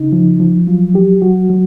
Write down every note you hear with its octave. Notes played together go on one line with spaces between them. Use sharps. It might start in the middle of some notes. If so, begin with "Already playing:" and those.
Already playing: C#3 D#4
F3
F3
F#3 F4
F#3 G4
F#3 F#4
F#3